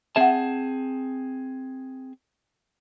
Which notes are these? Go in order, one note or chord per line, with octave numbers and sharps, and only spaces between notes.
C4 G#4 E5 F#5 A5